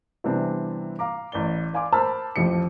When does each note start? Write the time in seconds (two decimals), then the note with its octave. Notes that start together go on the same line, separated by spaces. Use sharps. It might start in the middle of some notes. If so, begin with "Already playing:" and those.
0.24 C3 E3 G3 B3 C4 D4
0.99 F5 A#5 D6
1.32 A1 D5 G7
1.73 D5 F5 G#5 C6 D6
1.92 A#4 C5 A5 B5 E6 F6
2.36 A1 F2 F3 G4 C#7